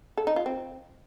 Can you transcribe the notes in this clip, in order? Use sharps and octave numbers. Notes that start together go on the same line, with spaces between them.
A4
D#4
F4
C4